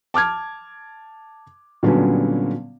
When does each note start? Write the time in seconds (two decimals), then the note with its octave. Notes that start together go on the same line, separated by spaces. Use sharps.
0.14 A5 D6 F6 G#6
1.83 A#2 D3 F#3 G3 B3 C#4